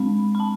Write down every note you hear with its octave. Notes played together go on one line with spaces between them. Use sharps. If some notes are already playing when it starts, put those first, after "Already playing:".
Already playing: G#3 C4 B5
B5
A5